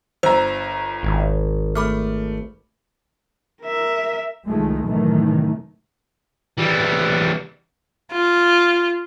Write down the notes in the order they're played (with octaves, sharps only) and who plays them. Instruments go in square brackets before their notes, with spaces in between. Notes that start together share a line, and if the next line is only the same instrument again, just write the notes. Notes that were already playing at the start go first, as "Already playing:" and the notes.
[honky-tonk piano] G1 A#5 [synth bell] C5 E6
[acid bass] G#1
[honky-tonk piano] A3 [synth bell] B5 D6 F6
[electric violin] A#4 E5
[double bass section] C2 D#3 F3 G#3 A3
F#2 A2 C3 D#3 E3 A3
[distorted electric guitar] E3 G3
[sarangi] F4